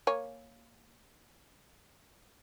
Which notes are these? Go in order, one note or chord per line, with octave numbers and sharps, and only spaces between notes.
A#3 C#5 G#5